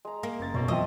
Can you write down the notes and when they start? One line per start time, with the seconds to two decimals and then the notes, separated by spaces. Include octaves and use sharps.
0.05 G#3 A#5
0.23 A#3
0.39 F#1 A6
0.54 F#1 E2 B2 C#5
0.68 F3 F#3 C4 D#5 E5 A5